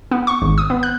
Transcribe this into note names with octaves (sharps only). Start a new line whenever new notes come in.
B3
C#6
G#1
D#6
B3
F#6